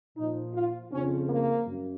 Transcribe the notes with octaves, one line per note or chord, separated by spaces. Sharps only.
A#2 F3 D#4
F4
F2 C#3 F3 C#4
A#3
F#2